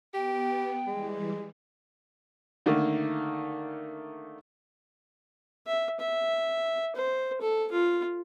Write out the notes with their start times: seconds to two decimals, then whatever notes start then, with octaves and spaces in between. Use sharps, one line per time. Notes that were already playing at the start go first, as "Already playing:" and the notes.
0.14 B3 G4 G5
0.87 E3 G3 G#3
2.66 D3 D#3 A3 A#3
5.67 E5
6.00 E5
6.95 C5
7.41 A4
7.72 F4